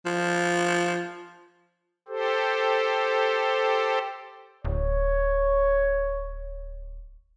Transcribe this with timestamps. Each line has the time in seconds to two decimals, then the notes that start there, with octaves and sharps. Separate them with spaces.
0.05 F3
2.08 G4 A4 C5
4.65 D1 C#5